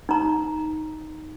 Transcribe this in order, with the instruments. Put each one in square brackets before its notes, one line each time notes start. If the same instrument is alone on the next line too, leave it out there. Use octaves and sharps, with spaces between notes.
[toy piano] D#4 A#5